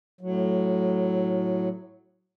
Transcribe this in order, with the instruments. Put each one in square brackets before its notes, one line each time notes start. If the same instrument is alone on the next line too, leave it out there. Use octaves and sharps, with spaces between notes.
[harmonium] A2 F#3